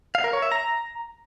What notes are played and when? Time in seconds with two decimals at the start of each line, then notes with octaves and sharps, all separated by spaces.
0.15 F5
0.24 A#4
0.33 C#5
0.42 E5
0.52 A#5